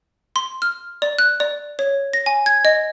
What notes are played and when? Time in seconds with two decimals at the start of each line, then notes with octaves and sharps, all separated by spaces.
0.36 C6
0.62 F6
1.02 D5
1.19 F#6
1.40 D5
1.79 C#5
2.13 A#6
2.26 G#5
2.46 G#6
2.65 D#5